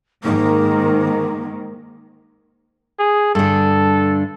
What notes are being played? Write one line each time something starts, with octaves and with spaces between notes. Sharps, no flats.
G#2 D#3 A#3
G#4
G2 D3 A4